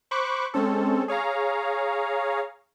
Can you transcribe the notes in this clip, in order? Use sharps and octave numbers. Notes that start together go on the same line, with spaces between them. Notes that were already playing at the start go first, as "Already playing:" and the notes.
C5 B5 C#6 D6 F#6
G#3 C4 C#4 A4
G#4 C#5 F5 A#5